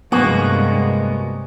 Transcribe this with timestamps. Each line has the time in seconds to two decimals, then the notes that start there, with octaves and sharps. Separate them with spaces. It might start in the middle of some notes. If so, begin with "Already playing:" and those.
0.12 G2 C3 G#3 A#3 B3 F#4